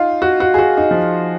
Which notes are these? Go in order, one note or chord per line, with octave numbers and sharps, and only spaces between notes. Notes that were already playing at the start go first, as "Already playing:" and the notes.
Already playing: D#4 F4
F#4
F#4
G#4
F#4
D#4
F3